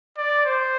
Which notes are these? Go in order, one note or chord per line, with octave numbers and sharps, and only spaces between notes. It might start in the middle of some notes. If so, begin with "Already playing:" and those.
D5
C5